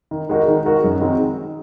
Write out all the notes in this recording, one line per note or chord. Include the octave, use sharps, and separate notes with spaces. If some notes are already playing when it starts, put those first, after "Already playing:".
D#3
G#3 D#4 F#4 A#4
D#3
G#3 D#4 F#4 A#4
F#2
D#3 G#3 C4 F#4